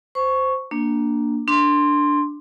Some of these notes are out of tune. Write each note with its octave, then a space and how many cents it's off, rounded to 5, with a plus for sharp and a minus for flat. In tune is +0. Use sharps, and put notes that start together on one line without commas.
C5 -10 C#6 +0
A#3 +0 D4 +0
D4 +0 C6 +0